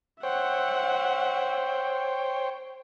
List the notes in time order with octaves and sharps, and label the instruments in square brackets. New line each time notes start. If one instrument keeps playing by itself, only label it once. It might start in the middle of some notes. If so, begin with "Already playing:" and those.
[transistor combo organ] C5 C#5 G5 [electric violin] E5 F#5